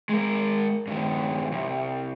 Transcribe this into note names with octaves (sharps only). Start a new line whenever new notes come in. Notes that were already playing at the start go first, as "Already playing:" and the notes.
G#3 A#4
G2 D#3
C2